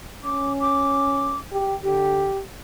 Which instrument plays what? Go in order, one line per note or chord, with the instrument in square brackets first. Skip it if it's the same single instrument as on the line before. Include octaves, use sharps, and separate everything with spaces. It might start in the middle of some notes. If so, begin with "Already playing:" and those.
[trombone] C#4 [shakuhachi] D6
[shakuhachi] D6
[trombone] G4
[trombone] D3 [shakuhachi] G4